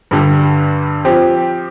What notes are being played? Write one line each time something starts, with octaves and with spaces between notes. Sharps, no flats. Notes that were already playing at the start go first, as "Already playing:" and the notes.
G2 D3 G3
F3 C4 G4